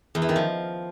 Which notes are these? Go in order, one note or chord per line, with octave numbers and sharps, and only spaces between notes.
E2
E3
D#3
F3